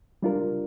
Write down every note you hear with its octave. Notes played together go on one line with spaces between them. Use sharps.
G3 D4 F4 A#4